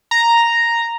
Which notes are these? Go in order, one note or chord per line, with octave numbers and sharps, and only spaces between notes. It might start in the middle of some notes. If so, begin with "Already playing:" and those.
A#5